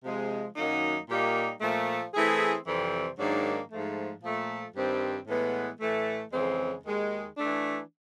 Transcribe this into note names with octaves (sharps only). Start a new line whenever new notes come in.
C3 F3 G#3
F#2 D#3 F#3 A#3 D#4
A#2 G3 A#3 D#4 G4
A#2 F3 A3
E3 A3 C4 E4 G#4
F2 C3 E3 G3 C4
G#2 D#3 F#3 A#3 D4
G#2 F3 A3
A#2 F3 A3
G2 D#3 G3 C4
A2 E3 G#3 B3
A2 E3 A3
F2 C#3 E3 G#3 C4
D#2 D#3 G#3
E3 A3 D4